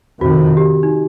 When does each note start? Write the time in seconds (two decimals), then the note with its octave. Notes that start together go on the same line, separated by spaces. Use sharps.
0.21 F2 C3 D#3 F#4
0.57 G4
0.83 D#4